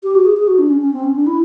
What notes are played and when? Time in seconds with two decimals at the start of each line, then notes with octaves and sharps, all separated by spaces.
0.03 G4
0.15 F#4
0.25 G#4
0.38 G#4
0.48 F#4
0.59 D4
0.70 C#4
0.82 C#4
0.93 C4
1.03 C#4
1.16 D4
1.27 E4